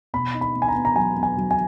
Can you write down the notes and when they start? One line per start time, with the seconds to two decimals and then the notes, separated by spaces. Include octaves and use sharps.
0.14 B2 B5
0.34 D#4
0.41 B5
0.55 B3
0.62 G#5
0.68 A#5
0.75 B3
0.85 A#5
0.96 F#3 G#5
1.16 B3
1.23 G#5
1.37 F#3
1.51 G#5